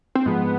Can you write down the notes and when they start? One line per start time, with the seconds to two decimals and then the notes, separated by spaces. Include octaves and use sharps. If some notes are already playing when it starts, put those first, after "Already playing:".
0.15 C4
0.26 G#2 F3 G#3 B3